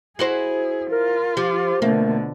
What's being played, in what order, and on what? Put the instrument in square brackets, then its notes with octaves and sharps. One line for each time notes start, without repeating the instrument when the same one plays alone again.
[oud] E4 F#4 C5 [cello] G#4
[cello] F4 [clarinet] A#4
[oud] F3 [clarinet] G4
[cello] B2 D3 [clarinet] A3 [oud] A#3